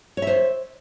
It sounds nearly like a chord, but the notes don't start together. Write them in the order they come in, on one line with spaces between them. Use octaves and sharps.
C#5 E5 C5